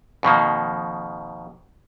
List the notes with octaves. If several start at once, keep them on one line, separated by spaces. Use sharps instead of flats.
F2 B2 D#3 A#3